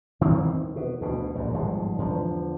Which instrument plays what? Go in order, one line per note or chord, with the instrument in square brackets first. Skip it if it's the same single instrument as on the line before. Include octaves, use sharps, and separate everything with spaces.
[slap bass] E2 D#3 E3 C4
B2
D2 B2
A#1 F#2
G1 G#2 F3 G#3
E2 D3 F3